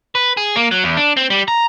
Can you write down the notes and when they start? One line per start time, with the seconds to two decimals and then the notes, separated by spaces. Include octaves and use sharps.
0.15 B4
0.37 G#4
0.56 A#3
0.71 F#3
0.84 E2
0.97 D4
1.17 C4
1.30 G3
1.48 A#5